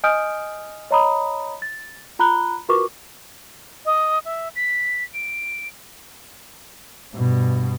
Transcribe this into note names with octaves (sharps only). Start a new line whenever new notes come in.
D#5 G#5 D#6 F6 G6 D7
C#5 D#5 A#5 B5 D#6
A6
F4 A#5 B5 F#6 G7
F4 F#4 A#4 B4 C#6 D6
D#5
E5
B6
D7
G2 B2